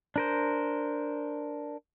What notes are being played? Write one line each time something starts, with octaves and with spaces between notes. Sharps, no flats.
D4 A#4 C5